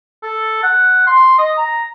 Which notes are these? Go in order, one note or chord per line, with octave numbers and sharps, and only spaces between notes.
A4
F#5
C6
D#5
A#5